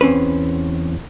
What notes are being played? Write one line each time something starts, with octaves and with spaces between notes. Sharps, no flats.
E2 C4 C#4 B4